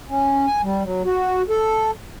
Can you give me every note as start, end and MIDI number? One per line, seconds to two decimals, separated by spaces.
0.09 0.46 61
0.47 0.62 80
0.63 0.83 55
0.83 1.03 54
1.05 1.42 66
1.49 1.91 69